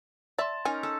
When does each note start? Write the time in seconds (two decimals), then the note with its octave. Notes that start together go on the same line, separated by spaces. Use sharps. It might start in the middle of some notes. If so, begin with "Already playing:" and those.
0.38 D5 E5 A5 C6 A6
0.65 C#4 D#4 A#4 G#5
0.83 A4 E6